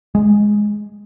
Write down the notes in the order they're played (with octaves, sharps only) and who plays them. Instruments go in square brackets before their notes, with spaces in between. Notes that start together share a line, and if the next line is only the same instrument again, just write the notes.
[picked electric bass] G#3